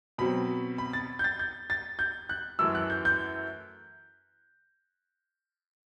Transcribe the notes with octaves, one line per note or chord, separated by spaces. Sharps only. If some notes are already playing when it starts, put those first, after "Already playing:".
B2 F#3 C4 B5
B5
A6
G6
A6
G6
A6
G6
F#6
F#2 E3 A3 E6
F#6
G6
G6